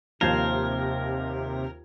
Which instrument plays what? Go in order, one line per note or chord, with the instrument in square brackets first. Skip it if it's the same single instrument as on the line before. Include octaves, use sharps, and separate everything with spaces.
[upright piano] D#2 G#6 [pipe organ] C3 [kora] F3 C5 [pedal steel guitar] A#4